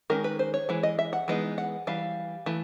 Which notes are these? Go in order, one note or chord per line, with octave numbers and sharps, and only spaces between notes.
D#3 G#3 C#4 A#4
B4
C5
C#5
E3 G#3
D#5
E5
F#5
E3 G#3 B3 D#4
F#5
E3 G3 F5
E3 A3